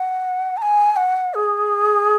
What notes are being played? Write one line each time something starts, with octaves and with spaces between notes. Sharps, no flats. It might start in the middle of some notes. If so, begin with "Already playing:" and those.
Already playing: F#5
A#5
G#5
F#5
G#4